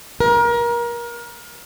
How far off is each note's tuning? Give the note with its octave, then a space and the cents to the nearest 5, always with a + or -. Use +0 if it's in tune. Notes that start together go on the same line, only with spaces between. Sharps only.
A#4 +25